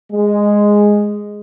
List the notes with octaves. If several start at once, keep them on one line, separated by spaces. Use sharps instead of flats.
G#3